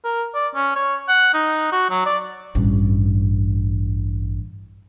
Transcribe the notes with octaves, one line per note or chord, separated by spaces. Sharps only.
A#4
D5
C#4
C#5
F#5
D#4
F#4
F#3
D5
A1 G2